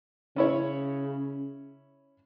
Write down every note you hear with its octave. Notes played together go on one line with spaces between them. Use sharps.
C#3 C#4 E4 C#5